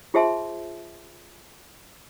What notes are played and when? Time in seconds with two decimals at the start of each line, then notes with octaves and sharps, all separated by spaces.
0.14 F4 G#4 C5 E5 A5 C6